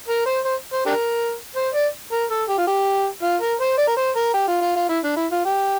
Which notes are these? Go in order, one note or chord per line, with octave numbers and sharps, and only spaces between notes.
A#4
C5
C5
C5
D4 G4 A#4
C5
D5
A#4
A4
G4
F4
G4
F4
A#4
C5
D5
A#4
C5
A#4
G4
F4
F4
F4
E4
D4
E4
F4
G4